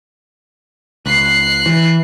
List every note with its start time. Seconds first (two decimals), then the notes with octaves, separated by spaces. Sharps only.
1.06 C#2 F#6 C7
1.66 E3